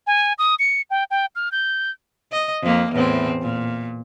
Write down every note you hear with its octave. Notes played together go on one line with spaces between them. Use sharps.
G#5
D#6
C#7
G5
G5
F6
G6
D#5
F2 A#3
E2 A2 C4
A#2